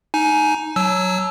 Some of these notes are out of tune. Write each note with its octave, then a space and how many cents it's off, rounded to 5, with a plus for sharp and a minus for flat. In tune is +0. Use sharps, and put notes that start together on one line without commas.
D#4 +0 G#5 +20
F#3 +0 A5 -35 E6 +0